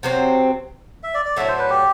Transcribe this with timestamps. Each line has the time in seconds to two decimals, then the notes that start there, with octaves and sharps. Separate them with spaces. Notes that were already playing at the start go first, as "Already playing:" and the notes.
0.03 C3 F#3 C4 C5
1.03 E5
1.14 D5
1.25 D5
1.37 A2 F#3 A3 D4 E5
1.48 C5
1.59 B4
1.70 G4